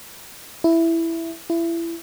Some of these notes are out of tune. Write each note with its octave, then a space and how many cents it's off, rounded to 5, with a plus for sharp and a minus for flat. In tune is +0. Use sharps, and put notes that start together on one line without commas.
E4 +5
E4 +25